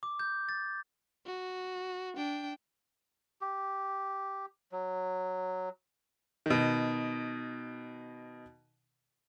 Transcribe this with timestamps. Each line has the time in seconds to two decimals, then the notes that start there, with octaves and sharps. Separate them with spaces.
0.03 D6
0.19 G6
0.49 A6
1.26 F#4
2.17 D4 G5
3.41 G4
4.72 F#3
6.46 B2 D#3